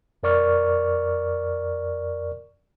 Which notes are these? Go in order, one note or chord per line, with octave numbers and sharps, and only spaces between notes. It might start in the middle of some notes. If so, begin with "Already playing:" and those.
F2 A#4 D5 C#6 F6